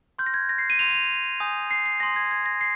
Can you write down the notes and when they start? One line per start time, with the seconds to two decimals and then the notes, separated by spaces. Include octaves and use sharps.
0.19 C6 F6 G6
0.26 A#6
0.34 G#6
0.49 A#6
0.58 C7
0.70 D#7
0.79 C6 G6 F7
0.94 F7
1.40 G#5 D#6 G6
1.71 C7
1.86 C7
2.00 G#5 C6 D#6 A#6
2.16 G#6
2.31 G#6
2.46 A#6
2.61 C7